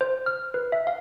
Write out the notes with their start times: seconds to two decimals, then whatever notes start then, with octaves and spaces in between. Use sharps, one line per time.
0.01 C5
0.26 F6
0.54 B4
0.72 E5
0.87 F5